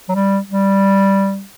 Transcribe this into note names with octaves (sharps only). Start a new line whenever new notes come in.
F#3
G3
G3